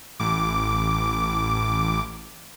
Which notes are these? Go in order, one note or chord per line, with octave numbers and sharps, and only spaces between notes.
A1 D6